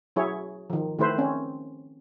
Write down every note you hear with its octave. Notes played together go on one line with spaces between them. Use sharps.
F#3 E4 G#4 C#5
D#3 F3
D#3 A3 E4 B4 C5
C4 C#4